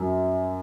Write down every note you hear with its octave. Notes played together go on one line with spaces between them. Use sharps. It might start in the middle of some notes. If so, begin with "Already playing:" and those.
Already playing: F#2